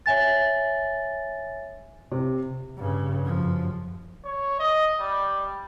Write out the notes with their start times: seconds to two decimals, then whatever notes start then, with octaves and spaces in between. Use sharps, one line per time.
0.06 C#5 E5 G#5 A6
2.12 C3
2.77 G2 C#3
3.25 F#2 F3
4.25 C#5
4.60 D#5
5.00 G3